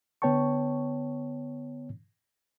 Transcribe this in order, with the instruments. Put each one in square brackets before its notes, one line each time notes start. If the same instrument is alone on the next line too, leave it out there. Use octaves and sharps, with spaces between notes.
[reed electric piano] D3 B3 C#5 G5 A5 C#6